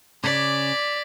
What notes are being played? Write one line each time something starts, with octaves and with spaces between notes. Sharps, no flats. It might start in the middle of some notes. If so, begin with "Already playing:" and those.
C#3 D5 D6 G#6 B6